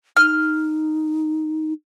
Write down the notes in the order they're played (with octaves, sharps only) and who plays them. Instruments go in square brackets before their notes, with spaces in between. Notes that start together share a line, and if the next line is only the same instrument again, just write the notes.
[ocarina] D#4 [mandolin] F6